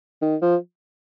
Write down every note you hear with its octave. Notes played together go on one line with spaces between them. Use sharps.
D#3
F3